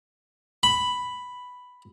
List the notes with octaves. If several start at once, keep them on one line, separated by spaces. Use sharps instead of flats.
B5